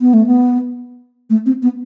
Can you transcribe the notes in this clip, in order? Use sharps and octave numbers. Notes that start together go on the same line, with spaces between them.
B3
A3
B3
A3
C4
B3